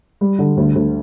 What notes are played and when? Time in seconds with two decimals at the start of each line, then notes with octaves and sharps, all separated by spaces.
0.21 G3
0.39 D3
0.57 D2
0.75 D2